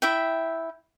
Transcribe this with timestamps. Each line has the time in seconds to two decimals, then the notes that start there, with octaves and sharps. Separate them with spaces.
0.02 E4 E5 G5